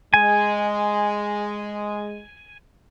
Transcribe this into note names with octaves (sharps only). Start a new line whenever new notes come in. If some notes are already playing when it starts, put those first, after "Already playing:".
G#3 G#5